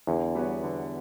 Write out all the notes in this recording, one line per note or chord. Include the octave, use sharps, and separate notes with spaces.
E2 D3
G3 B3 F#4 C#5
D3